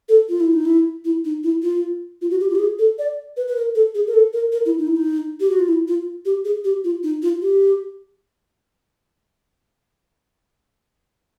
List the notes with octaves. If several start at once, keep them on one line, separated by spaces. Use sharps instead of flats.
A4
F4
E4
D#4
E4
E4
D#4
E4
F4
F4
F#4
G4
F4
G4
G#4
A4
D5
B4
B4
A#4
A4
G#4
A#4
A4
A#4
A#4
E4
D#4
E4
D#4
G4
F#4
F4
E4
F4
G4
G#4
G4
F4
D#4
F4
G4